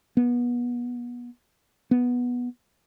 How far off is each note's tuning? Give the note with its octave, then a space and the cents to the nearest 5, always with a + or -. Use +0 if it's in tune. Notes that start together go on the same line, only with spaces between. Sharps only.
B3 -30
B3 -10